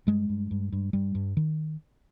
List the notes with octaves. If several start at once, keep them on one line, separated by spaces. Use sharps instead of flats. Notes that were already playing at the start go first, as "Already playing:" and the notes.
G2 G#3
G2
G2
G2
G2 G3
G2
D#3